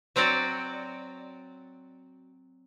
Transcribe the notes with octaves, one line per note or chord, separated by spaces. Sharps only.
F#3 C4 F#4 D5